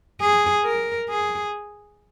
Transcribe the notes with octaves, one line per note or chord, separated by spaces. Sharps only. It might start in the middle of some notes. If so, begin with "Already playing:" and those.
G#4
A#4
G#4